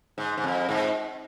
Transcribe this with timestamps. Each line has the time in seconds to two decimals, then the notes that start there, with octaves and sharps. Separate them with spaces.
0.18 G#2
0.37 G#2
0.44 F2
0.69 G#2